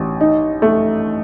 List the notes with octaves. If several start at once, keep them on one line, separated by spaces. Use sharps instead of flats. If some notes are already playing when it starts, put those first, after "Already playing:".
Already playing: A1
D#4
A3